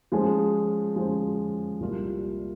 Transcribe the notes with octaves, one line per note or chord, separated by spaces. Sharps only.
F3 G#3 C#4 G#4 C5
F3 G#3 C#4 G#4 C5
C2 A#2 G3 A#3 F4